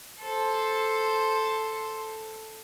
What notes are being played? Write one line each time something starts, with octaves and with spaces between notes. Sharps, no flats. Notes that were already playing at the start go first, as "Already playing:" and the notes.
A4 C5